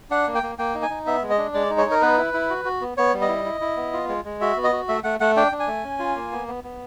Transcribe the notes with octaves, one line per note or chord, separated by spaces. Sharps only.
D4 F#5
A#3
G5
A#3
A#3 G5
D#4
G#5
D#4
B3 E5
G#3
D#5
D4
G#3 D5
D#4
C#5
D#4
A#4
B3 B4
E4
E4
F#4
F#4
B3
B3 C#5
G3
D#5
E4
E4
E4
B3
F4
G#3
G#3
F#4 E5
B3
D#5
F#4
A3 E5
A3 F#5
A3 F#5
D4 G5
D4
G#5
A3
C#4
F4
A#3
B3
B3
B3